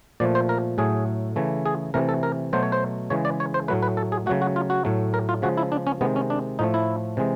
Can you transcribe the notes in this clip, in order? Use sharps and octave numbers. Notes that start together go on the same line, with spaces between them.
A#2 F3 A3 D5
C5
A#4
A2 F#3 A3 G#4
C#3 E3 A3
G#4
C3 E3 A3 A#4
A4
A#4
B2 F#3 A3 C5
C#5
C5
C#3 E3 G#3 C#5
D5
C#5
C5
A2 F#3 A3 B4
B4
A4
G#4
C#3 F#3 A3 F#4
F#4
F4
F#4
A2 F#3 A3
A#4
F4
C#3 F3 G#3 F#4
E4
D4
C#4
C3 D#3 G#3 B3
C#4
D4
A2 F3 A3 D#4
E4
C3 E3 G#3